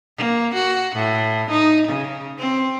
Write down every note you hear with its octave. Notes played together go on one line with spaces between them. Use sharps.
A#3
F#4
A2
D#4
C#3
C4